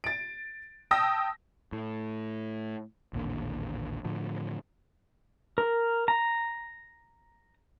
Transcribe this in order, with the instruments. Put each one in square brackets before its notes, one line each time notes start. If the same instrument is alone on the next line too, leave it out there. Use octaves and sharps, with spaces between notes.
[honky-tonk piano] A6 D7
G5 A5 D#6 E6 A#6
[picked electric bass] A2
A1 D#2 A#2 D3
A2 D3 F3
[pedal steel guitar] A#4
A#5